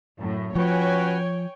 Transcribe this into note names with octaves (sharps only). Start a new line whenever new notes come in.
F#2 A2
F3 C#4 F#4 B4 C#5 G5 G#5